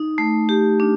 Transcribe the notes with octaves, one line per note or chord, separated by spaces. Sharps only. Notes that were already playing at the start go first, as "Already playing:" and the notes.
Already playing: D#4
A3
G4
D4